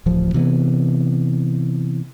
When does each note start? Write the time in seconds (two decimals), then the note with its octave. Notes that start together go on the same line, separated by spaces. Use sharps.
0.06 D1 A1 F3
0.34 C3 E3 B3